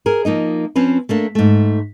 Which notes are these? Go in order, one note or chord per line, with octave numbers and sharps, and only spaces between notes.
G#4 A#4
F3 A#3 D#4 D#5
F3 C4 C#4 B4
A3 A#3 D4
G#2 A3